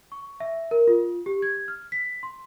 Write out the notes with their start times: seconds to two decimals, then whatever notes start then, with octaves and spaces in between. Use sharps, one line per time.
0.12 C#6
0.40 E5
0.71 A#4
0.88 F4
1.26 G4
1.42 G#6
1.68 F6
1.92 B6
2.23 C6